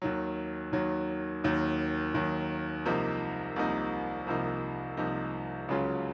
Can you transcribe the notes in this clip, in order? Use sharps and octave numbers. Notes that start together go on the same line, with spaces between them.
D#2 D#3 F#3
D#2 D#3 F#3
D#2 D#3 F#3
D#2 D#3 F#3
C2 C3 F3 A#3 D#4
C2 C3 F3 A#3 D#4
C2 C3 F3 A#3 D#4
C2 C3 F3 A#3 D#4
C#2 C#3 F#3 C#4 F4